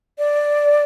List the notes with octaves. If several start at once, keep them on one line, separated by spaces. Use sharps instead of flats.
D5